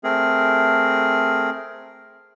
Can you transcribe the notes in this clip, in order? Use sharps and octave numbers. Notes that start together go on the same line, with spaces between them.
A3 C4 G#4 A#4